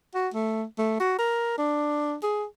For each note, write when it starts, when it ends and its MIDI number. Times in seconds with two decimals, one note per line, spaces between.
0.14 0.29 66
0.34 0.64 57
0.79 0.96 57
1.00 1.15 66
1.19 1.56 70
1.58 2.15 62
2.23 2.45 68